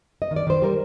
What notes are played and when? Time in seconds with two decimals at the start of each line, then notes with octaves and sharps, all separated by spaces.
0.22 D#5
0.31 D#3
0.36 D5
0.47 D#3 C5
0.62 G3 A#4